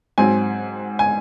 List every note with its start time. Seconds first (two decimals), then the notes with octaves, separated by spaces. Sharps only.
0.18 G#2 F#3 C4 G#5
0.99 G#5